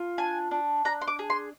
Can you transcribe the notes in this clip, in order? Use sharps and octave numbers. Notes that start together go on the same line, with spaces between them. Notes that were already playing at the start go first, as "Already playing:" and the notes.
Already playing: F4
D4 G#5
D4
D4 A#5
C6
D6
G#4
C6